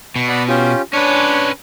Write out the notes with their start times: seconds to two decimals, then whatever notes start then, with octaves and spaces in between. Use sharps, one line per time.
0.16 B2 C#6
0.28 D5 F#5 B5
0.48 C#4 F4 G4
0.93 C#4 D4 B4 C#5